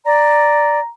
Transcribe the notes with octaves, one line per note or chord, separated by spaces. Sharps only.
D5 A#5